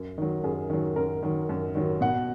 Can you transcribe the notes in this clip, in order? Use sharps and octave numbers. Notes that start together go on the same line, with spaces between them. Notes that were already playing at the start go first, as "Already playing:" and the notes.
Already playing: F#2
D#3 F#3
F#2 G#4
D#3 F#3
F#2 A#4
D#3 F#3
F#2
D#3 F#3
B2 F#5